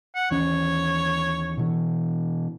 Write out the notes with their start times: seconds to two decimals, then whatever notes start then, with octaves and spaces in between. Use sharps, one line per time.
0.15 F#5
0.31 D#2 E3 C#4 C#5
1.57 B2 E3